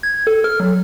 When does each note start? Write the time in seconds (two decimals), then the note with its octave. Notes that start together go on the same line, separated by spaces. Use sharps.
0.03 G#6
0.27 A4
0.44 F6
0.60 F#3